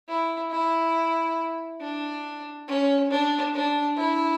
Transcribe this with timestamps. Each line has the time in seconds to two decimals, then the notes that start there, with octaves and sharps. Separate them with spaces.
0.09 E4
0.51 E4
1.81 D4
2.68 C#4
3.10 D4
3.54 D4
3.97 E4